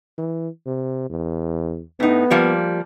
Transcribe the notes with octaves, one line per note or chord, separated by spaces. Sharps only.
E3
C3
E2
A2 B3 D#4
F3 G3 A#3